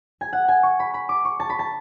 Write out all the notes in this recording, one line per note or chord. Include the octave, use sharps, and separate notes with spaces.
G#5
F#5
G#5
C#6
B5
B5
D6
C#6
A5
B5
A5